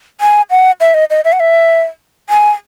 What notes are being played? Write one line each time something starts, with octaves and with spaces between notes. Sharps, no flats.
G#5
F#5
E5
D#5
D#5
E5
F#5
E5
G#5